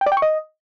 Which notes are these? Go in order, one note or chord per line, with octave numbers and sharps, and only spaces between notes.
G5
D5
G5
C#6
D#5